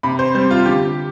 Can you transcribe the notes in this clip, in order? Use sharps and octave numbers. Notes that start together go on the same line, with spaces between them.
C3 B5
C5
G3 C4 C5
F4
D3 G4